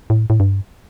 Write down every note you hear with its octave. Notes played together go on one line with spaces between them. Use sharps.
A2
A2
G2